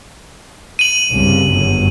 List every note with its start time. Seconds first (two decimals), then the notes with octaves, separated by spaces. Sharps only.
0.79 D#7 F#7
1.11 C2 G2 C#3
1.50 G1 F#2